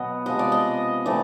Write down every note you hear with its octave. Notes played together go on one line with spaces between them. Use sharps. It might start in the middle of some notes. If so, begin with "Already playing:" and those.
Already playing: B2 F#3 B3 D#5
C3 F3 G#3 B3 D#5
D5
D#5
E3 A3 C4 D5